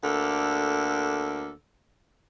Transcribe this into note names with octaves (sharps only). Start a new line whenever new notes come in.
D2 A#3 D4 A4